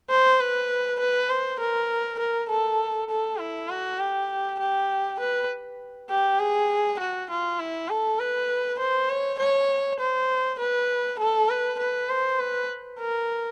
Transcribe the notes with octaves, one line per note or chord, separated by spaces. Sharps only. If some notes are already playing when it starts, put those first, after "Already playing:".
C5
B4
B4
C5
A#4
A#4
A4
A4
E4
F#4
G4
G4
B4
G4
G#4
F#4
F4
E4
A4
B4
C5
C#5
C#5
C5
B4
A4
B4
B4
C5
B4
A#4